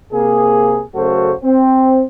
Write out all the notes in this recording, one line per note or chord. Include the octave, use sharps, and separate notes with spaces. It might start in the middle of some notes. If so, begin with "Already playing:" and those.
C3 A#3 G#4
F#2 C#3 A3 F#4 A4 C5
C4